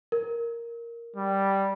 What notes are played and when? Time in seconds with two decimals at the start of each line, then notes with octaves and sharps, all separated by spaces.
0.12 A#4
1.16 G3